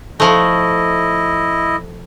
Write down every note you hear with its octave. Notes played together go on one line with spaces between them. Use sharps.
F3 A3 E4 D#5